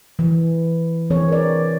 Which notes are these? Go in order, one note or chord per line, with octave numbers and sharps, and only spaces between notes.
E3
E3 C4 G#4 C#5
A#4 D5